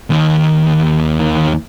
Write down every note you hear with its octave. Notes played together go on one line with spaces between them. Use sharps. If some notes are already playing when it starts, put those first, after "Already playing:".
D#2 D#3